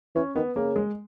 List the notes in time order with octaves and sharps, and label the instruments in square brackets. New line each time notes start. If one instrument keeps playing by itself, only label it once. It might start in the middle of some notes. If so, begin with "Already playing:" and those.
[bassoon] E3 [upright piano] C#4
[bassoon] D#3 [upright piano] B3
[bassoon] C#3 [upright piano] A#3
[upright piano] G#3